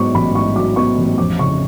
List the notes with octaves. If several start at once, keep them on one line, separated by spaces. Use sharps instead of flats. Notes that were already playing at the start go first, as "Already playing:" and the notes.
Already playing: G#2 F#3 B3 C#6 D6
A1 B5
G#2 C#6
F#3 D6
B3 C#6
A1
F2 D6
C#3 C#6